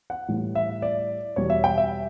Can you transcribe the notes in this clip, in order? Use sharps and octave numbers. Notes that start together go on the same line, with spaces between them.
F#5
A2 E3 G3
E5
D5
E2 B2 G3 C#5
E5
G5
E5